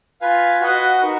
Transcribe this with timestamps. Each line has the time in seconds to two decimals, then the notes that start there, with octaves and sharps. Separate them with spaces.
0.21 F4 B4 F5 G#5
0.61 F#4 B4 D#5 F#5
1.01 D#4 F#4 A#4